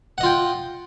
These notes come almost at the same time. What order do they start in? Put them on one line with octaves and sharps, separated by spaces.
F#5 D#5 F4 G5